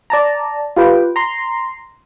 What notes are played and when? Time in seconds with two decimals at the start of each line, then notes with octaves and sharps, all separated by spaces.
0.10 D5 A5 A#5
0.76 F4 G4 B4 G5
1.16 A#5 C6